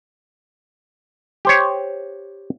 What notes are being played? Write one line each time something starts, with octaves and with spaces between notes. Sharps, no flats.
G4 C5 C#5